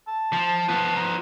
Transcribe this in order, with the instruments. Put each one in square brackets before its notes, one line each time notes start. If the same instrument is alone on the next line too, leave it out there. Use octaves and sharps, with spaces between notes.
[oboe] A5
[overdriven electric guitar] F3
F3 B3
[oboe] A#5